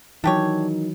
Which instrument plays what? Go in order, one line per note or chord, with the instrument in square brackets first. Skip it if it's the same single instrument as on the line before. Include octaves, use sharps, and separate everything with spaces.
[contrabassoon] D#3 [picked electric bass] E3 F#3 [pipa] D4 G4 C#5